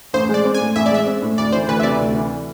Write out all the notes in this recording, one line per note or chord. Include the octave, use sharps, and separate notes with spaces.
A1 C5
G#3 D5
C4
G#5
A2
A1 E5
D5
G#3 E5
C4
A2
D2 D5
E3 C5
D2 B4
E5
C3 D5
D2
E3